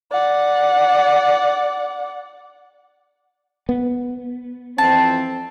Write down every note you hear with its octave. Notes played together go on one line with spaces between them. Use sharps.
D5 F#5
B3
F2 E3 C4 A5